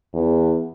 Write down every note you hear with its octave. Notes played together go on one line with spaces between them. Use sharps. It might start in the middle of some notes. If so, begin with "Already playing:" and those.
E2